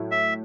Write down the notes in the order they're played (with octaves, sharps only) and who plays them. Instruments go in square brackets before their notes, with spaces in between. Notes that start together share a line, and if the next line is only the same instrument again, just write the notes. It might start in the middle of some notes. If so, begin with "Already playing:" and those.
Already playing: [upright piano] A2 F#3 A3 E4
[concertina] E5